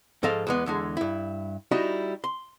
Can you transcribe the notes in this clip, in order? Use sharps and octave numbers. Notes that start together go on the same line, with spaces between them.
G#2 F3 A4 D#5 F5
E2 G#3 B3
E2 D3 G#3
G2 E4
G3 D#4 E4 F#4 D#5
C6